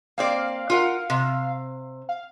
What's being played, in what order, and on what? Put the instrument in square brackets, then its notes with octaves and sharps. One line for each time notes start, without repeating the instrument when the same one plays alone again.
[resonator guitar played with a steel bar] A#3 C4 D5 [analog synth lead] F5
[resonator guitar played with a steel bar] F4 A#4 F#5
C3
[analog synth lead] F5